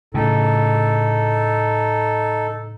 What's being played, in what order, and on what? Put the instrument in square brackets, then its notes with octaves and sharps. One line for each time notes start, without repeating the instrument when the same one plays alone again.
[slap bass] A2 C#3 [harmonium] D#4 A4